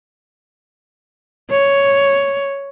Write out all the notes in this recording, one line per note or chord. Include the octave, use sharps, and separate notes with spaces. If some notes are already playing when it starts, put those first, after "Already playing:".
C#5